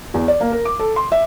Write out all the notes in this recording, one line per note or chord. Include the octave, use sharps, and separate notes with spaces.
E2
D5
A#3
A#4
D6
A4
C6
E5